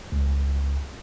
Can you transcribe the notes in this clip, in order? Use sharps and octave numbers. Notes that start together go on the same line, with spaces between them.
C#2